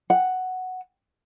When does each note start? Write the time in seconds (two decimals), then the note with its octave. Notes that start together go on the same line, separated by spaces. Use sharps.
0.10 F#5